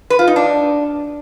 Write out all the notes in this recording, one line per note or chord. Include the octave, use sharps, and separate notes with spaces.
B4
F4
D#4
D4